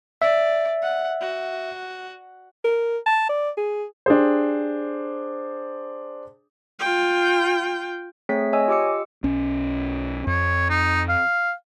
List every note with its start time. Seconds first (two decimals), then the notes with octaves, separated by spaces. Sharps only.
0.22 D5 E5
0.82 F#5
1.21 F#4
2.64 A#4
3.06 A5
3.29 D5
3.57 G#4
4.06 D4 G4 G#4 C5
6.80 F4 G5
8.29 A3 C4 G#4 C#5 B6
8.53 C#5 D#5 G#5 E6
8.68 F4 G4 D#5 D6 E6 C#7
9.23 B1 C#4
10.27 F2 C#5
10.69 D#4
11.09 F5